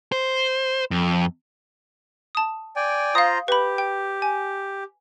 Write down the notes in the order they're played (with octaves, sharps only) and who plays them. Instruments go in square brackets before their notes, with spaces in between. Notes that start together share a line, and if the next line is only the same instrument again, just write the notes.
[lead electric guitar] C5
F2
[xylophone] A5 D#6
[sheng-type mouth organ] D5 G5 G#5
[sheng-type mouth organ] F4 C5 A#5 [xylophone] F5 D#6
[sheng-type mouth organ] G4 [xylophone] B4 B5
[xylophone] G5
G#5